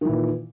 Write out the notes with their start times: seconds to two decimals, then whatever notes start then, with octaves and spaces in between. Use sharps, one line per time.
0.01 D#3
0.05 E3
0.09 A#2